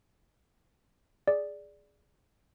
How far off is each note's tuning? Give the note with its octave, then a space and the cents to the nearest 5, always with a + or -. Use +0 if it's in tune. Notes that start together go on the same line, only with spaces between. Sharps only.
G#4 +0 D5 +0